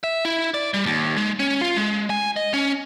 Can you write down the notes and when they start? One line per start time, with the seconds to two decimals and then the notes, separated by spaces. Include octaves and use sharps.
0.04 E5
0.25 E4
0.54 D5
0.74 G3
0.86 D#2
1.17 G#3
1.40 C#4
1.61 F4
1.76 G#3
2.10 G#5
2.36 D#5
2.54 C#4